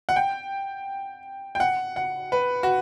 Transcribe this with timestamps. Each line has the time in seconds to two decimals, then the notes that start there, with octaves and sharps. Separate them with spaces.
0.09 F#5
0.16 G5
1.55 G5
1.60 F#5
1.96 F#5
2.32 B4
2.63 F#4